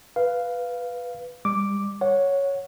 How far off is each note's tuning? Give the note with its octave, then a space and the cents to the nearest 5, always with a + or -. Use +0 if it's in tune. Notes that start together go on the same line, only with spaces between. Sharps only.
B4 +0 F5 -5
G3 +30 D6 +0
C#5 +0 F#5 -20